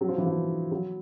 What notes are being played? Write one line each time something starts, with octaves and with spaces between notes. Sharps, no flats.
F#3
F3
E3
F3
F#3